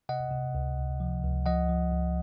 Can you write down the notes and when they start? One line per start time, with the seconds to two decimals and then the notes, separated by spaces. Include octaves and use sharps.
0.09 C3 D#5 F#5
0.31 C3
0.55 C#2
0.78 C#2
1.00 F3
1.24 C#2
1.46 F3 D#5 F#5
1.69 F3
1.91 C#2